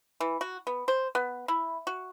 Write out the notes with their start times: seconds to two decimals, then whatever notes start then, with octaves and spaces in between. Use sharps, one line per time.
0.20 E3
0.41 F#4
0.67 B3
0.88 C5
1.15 B3
1.48 E4
1.87 F#4